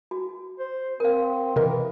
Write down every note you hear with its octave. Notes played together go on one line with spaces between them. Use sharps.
F#4
C5
C4 A#4 F5
C3 E3 A#4 D#5